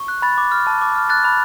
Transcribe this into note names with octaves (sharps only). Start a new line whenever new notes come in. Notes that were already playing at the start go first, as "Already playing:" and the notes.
Already playing: C#6
F#6
B5 A6
D6
F6
A5
D6
F6
F#6 A6
B5